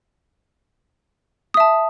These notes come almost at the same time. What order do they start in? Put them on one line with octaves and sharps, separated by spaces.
D#6 E5 A5